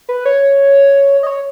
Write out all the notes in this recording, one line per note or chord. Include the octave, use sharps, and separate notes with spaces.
B4
C#5
D#5
C#5